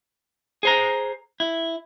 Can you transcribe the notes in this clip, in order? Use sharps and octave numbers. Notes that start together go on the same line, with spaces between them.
G#4 C5 A#5
E4